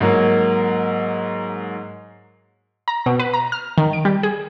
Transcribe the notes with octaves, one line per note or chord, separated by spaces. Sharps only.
G#2 F#3 A#3
A#5
B2
B4
A#5
F6
D#3
D7
G3
G#4